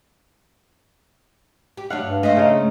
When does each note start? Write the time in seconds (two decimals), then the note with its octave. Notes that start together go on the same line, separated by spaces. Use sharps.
1.77 G4
1.90 D2 F#3 D4 F5 F#5
2.02 G2
2.23 A3 F4 C5 D#5
2.37 C#3 D#4